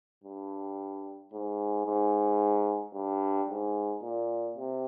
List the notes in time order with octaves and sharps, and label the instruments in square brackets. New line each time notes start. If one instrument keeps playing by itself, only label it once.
[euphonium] G2
G#2
G#2
G2
G#2
A#2
C3